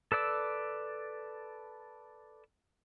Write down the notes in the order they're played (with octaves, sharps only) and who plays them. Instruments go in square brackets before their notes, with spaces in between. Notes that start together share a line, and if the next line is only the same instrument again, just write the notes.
[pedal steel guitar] A4 B4 D5 E6